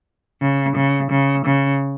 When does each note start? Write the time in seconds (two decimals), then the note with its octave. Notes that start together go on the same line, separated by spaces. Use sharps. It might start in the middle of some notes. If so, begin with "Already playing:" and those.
0.41 C#3
0.76 C#3
1.11 C#3
1.45 C#3